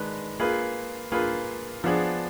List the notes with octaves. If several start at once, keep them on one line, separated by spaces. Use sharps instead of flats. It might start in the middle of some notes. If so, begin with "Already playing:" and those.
Already playing: D#3 G#3 D4 G#4 B4
A#3 F4 G#4 B4
A#3 F4 G#4 B4
F3 B3 D4 G#4